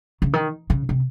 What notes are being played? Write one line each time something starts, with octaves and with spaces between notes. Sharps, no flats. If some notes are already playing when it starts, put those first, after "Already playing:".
C#3
D#3
C#3
C3